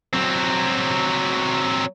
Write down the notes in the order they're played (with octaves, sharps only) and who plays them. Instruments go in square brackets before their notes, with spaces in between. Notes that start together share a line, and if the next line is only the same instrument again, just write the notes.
[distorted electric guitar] F#3 C4